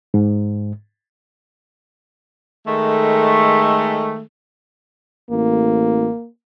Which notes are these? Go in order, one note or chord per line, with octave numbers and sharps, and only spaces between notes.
G#2
D#3 G#3 A3
A1 A#3